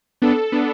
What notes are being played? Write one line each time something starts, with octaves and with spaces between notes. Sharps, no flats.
B3 D4 A4
B3 D4 A4